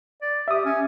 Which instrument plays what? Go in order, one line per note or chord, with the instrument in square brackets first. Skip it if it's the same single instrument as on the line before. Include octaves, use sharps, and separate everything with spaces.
[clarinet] D5
[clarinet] G4 [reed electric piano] E5 D#6
[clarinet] C#4